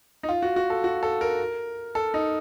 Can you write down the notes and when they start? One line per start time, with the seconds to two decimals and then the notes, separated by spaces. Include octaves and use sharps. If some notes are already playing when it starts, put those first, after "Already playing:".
0.23 D#4
0.29 F4
0.43 F#4
0.56 F#4
0.70 A4
0.84 F#4
1.03 A4
1.21 A#4
1.95 A4
2.14 D#4